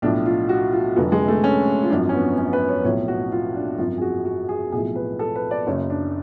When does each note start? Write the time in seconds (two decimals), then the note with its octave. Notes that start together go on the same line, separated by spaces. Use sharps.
0.02 B1 A2 F3 D4
0.26 F4
0.49 F#4
0.73 F4
0.96 F1 F2 D3 F#3
1.12 G#3
1.28 A3
1.44 C#4
1.83 F4
1.90 G#1 F#2 F3 D4
2.09 C#4
2.14 B3
2.38 C#4
2.53 B4
2.69 C#5
2.84 B1 A2 F3 C#5
3.08 F#4
3.32 F4
3.56 D4
3.78 G#1 F#2 F3 F4
3.98 G#4
4.02 F#4
4.25 F#4
4.49 G#4
4.72 B1 A2 F3 G#4
4.96 B4
5.19 A4
5.35 B4
5.51 D5
5.67 F#1 F#2 C#3 C#5
5.90 D4